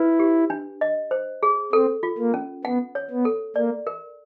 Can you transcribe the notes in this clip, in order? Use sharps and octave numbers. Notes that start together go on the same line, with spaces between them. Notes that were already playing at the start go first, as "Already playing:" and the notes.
Already playing: E4 B4
G4
D4
D#5
C5
G#4
C4 A4
F4
A#3
C#4
B3 F#5
C#5
B3
A4
A#3 D5
A#4